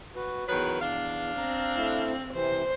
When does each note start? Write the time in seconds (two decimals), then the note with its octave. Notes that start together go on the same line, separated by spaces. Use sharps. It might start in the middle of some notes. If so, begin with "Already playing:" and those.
0.16 F#4 B4
0.48 E2 D#3 F#3 B4
0.81 D4 F5
1.38 C4 A#5
1.77 A3 E4
2.33 C3 E3 C5